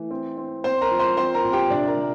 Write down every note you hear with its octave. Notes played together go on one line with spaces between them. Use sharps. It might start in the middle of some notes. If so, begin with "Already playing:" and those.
Already playing: E3 A3
C4
C4
C4 C5 C6
A#4 A#5
F3
C5 C6
C4 C5 C6
A#4 A#5
A#2
G4 G5
C3 D4 D5
A#4
C3